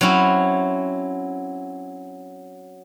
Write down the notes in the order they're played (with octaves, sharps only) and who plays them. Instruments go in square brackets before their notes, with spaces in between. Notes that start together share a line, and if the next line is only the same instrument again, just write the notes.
[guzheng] F#3 C4 C#4 E4